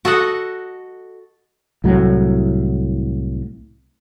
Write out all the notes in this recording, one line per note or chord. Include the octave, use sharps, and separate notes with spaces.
F#4 A4 D#5 F#5
C2 A2 F#3